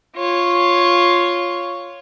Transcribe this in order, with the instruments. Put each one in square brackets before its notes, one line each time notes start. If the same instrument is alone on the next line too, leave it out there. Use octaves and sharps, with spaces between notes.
[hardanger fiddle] F4 C#5